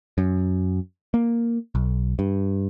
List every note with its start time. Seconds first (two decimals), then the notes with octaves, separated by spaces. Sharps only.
0.18 F#2
1.14 A#3
1.75 B1
2.19 G2